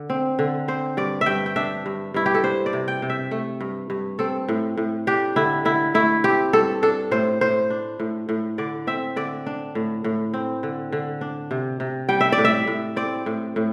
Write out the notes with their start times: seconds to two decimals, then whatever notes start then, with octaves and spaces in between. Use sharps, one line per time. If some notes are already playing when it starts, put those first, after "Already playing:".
Already playing: D3
0.10 C4
0.39 D3
0.68 C4 C5
0.97 G2 D5
1.21 E5
1.26 G2 G5
1.46 G5
1.56 D4 E5
1.86 G2
2.14 G2 E4
2.26 G4
2.35 A4
2.44 D4 C5
2.66 D5
2.73 C3
2.88 G5
3.02 C3
3.10 E5
3.31 A3
3.61 G2
3.90 G2
4.19 C4 A4
4.48 A2
4.77 A2
5.07 D4 G4
5.36 D3 E4
5.65 D3 E4
5.94 A3 E4
6.24 C4 G4
6.53 G2 A4
6.83 D4 A4
7.11 A2 C5
7.41 A2 C5
7.70 D4
7.99 A2
8.29 A2
8.58 D3 D5
8.87 C4 E5
9.16 D3 D5
9.46 D4
9.75 A2
10.04 A2
10.34 C4
10.63 D3
10.92 D3
11.21 D4
11.51 C3
11.80 C3
12.09 G3 G5
12.21 E5
12.32 D5
12.38 A2
12.45 E5
12.67 A2
12.96 C4 D5
13.26 A2
13.56 A2